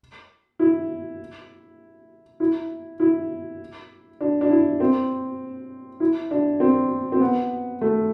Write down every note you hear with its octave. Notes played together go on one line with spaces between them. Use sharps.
E4
E4
E4
D4
D4
E4
C4
E4
D4
C4
C4
B3
A3